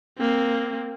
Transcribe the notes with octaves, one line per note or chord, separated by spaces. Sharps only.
A#3 C4